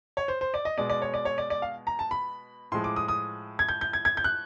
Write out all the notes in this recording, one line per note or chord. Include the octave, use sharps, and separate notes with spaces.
C#5
C5
C5
D5
D#5
B2 G#3 D5
D5
C#5
D5
C#5
D5
D5
F5
A#5
A5
B5
A2 F3 G#3 C6
D6
D#6
D#6
G#6
G6
G6
G#6
G#6
G6
F#6